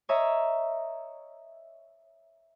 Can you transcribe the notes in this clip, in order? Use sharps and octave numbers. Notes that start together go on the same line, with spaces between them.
C#5 D#5 E5 A#5